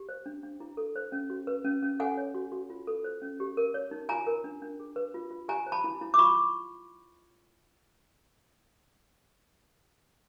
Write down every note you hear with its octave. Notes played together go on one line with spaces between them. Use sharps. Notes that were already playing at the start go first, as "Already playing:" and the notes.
Already playing: G4
C5
D4
D4
E4
A4
C5
C#4
F#4
B4
C#4
C#4
A4 F#5 G#5
C#5
F#4
F#4
F4
A4
C5
C#4
G4
A#4
C#5
D#4
F4 G#5 A#5
A#4
D4
D4
G#4
B4
F4
F4
G4 G#5 A#5
C5
A5 B5
E4
E4
D6
F4 B5 C#6